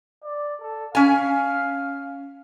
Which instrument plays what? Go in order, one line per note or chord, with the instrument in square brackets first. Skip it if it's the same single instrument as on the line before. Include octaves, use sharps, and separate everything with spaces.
[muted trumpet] D5
A4
[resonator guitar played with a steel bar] C#4 G#5 [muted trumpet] F5